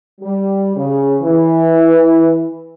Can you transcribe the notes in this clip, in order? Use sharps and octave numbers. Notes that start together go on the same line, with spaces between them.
G3
C#3
E3